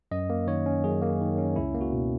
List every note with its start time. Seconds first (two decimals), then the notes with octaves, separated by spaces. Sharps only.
0.11 F#2 D#5
0.30 A#3
0.47 D#3 C#5
0.66 C#4
0.84 F#2 G#4
1.02 A#3
1.21 D#3
1.38 C#4
1.56 C#2 E4
1.74 A#3
1.81 F#4
1.93 B2